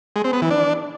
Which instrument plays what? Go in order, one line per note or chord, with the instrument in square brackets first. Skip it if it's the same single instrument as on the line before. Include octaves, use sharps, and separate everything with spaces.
[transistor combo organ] G#3
C4
B3
E3
D4